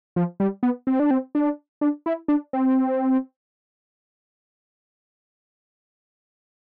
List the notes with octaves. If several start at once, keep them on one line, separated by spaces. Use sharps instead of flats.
F3
G3
B3
C4
D4
C4
D4
D4
E4
D4
C4